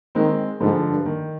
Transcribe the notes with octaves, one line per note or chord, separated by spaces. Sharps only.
D#3 G#3 C4
G#2 D3 F3
G2
D#3